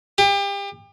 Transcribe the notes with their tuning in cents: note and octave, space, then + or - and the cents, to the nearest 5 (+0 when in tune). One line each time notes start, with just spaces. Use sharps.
G4 +35